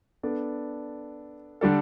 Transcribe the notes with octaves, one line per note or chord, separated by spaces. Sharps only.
B3 D4 A4 D5
D3 G3 D4 A4